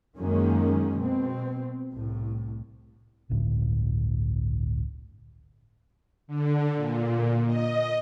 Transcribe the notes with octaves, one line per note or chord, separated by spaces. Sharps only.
F#2 D#3 F#3 G#3 A#3 C#4
B2 C4
C2 A2
G1 C#2 A2 D3
D3
A#2
D#5